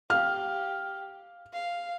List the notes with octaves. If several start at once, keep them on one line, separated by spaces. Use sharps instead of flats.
G4 F5 F6
F5